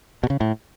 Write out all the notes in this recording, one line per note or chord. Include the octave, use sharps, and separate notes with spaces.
B2
C#3
A2